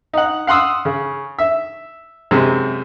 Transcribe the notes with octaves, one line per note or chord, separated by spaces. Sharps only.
D#4 F#5
F5 F#5 C6 D#6 E6
C#3
E5
F#2 C3 G#3